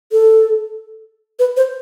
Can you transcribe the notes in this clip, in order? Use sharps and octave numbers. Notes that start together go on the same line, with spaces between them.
A4
B4
C5